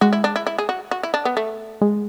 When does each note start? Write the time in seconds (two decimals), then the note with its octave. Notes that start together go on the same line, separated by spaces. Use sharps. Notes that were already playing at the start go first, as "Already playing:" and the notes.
0.01 G#3 F#4
0.13 E4
0.24 D4
0.36 E4
0.47 E4
0.59 G#4
0.69 F#4
0.91 F#4
1.03 E4
1.14 D4
1.25 B3
1.37 A3
1.81 G#3